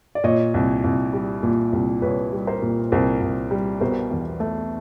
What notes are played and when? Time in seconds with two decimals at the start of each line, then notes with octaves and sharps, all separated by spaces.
0.15 D5
0.24 A#2 C#5 D#5
0.54 C2
0.84 C2
1.13 G3
1.43 A#2
1.73 C2
2.02 C2 B4 C#5
2.32 G3
2.47 A#4 C5
2.62 A#2
2.92 C2 A#4 C5
3.21 C2
3.51 G3
3.81 B2 A#4 C5
4.11 E2
4.40 A3